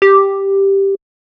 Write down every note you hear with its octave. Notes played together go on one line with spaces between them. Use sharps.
G4